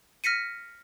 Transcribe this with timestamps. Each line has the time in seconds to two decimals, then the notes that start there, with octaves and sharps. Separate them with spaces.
0.24 F6 A#6 B6 C#7 D#7